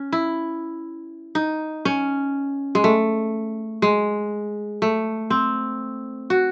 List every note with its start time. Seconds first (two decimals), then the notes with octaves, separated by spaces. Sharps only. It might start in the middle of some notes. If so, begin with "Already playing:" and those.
Already playing: C#4
0.13 E4
1.35 D#4
1.85 C#4
2.75 G#3
2.84 A3
3.82 G#3
4.82 A3
5.30 C4
6.30 F#4